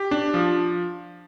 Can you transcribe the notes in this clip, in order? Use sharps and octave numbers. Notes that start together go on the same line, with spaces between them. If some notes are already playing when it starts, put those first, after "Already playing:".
Already playing: G4
D4
F3